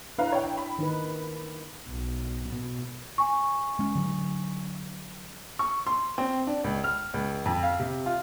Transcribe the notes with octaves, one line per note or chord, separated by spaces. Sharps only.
D4 E4 B4 F5 A#5
C#5 G5
B5
D#3 D#4 B4
B1
B2
G#5 C#6
G#3 C#4
D3 F#3
C#6
C6
C4
D4
C#2
F6
C#2
F2
F5
C3
F4